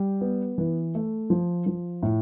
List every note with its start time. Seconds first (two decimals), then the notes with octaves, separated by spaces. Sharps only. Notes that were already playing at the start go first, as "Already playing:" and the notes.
Already playing: G3
0.21 B3
0.58 E3
0.95 A3
1.30 F3
1.66 F3
2.03 A2